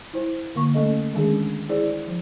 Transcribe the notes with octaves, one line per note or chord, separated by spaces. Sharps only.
E4 C5
D3 A#3 C#6
A3 C#4 A4 D#5
D#3 G#3 C#4 D4 G#4
E4 G#4 C5 D5
F3